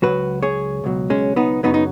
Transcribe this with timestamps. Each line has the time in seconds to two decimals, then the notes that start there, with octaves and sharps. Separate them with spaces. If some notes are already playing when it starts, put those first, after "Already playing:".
0.02 C#2 B2 F#3 F#4 B4
0.43 G#4 C#5
0.84 C#2 B2 F#3
1.10 G#3 C#4
1.36 B3 D#4
1.63 F#2 C#3 F#3 B3 D#4
1.74 D#4